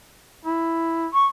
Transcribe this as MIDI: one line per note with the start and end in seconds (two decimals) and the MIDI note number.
0.45 1.08 64
1.13 1.26 85